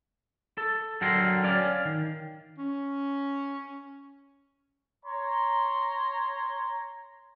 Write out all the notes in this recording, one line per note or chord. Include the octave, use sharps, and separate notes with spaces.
A4
D3 F#3 A4 A#4 G5 C6
C#4 D5 F5
D#3
C#4
C#5 A#5 C6